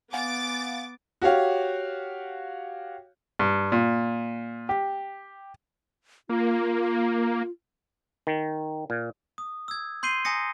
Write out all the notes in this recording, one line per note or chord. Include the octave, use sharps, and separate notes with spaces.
B3 F5 F#5 G#5 D6 A6
F#4 G4 C#5 F5
G2
A#2
G4
A#3 F4
D#3
A#2
D#6
E6 G#6
C6 G6 C7 D#7 G7
G#5 A#5 D#6 A#6 C#7